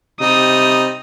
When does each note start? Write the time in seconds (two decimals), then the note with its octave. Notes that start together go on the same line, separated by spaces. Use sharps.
0.21 C3 G3 C4 D#4 D#6